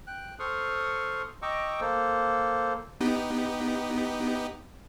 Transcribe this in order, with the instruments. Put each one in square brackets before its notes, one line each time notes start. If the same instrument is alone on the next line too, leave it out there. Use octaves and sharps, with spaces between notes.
[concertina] G5 F#6
A4 C5 C6 C#6 D#6 F6
D#5 G5 A#5 C#6 D6 E6
A#3 A4 C5
[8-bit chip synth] B3 D#4 G4